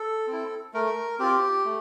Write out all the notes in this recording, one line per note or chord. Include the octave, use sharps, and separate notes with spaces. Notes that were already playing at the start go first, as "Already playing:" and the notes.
Already playing: A4
C4 E4
A3 A#4
C4 F4 G4
A3